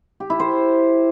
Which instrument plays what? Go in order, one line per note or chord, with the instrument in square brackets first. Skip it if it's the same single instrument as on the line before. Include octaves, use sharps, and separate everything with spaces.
[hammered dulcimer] G4
E4
C5